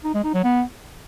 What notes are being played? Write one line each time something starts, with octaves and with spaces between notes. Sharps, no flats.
D#4
G#3
D#4
F#3
B3